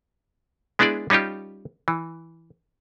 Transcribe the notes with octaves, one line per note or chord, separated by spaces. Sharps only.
G#3 B3 D4 E4 G#4 D5
G3 C#4 D#4 F4 G4
E3